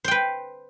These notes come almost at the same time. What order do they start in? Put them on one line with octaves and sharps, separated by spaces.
C5 G5 B4